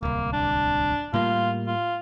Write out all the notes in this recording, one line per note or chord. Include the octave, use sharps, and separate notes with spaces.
D1 C2 A#3
D4
A2 G3 A#3 F4
F4